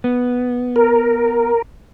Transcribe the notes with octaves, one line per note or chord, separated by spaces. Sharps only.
B3
A#4